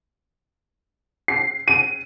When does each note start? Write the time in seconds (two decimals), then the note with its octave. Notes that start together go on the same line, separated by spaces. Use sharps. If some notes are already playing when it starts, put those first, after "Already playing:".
1.28 C7
1.68 D#7